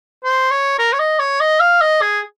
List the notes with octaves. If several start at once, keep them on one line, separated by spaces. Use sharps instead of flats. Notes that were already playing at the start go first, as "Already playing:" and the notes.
C5
C#5
A#4
C#5
D#5
C#5
D#5
F5
D#5
G#4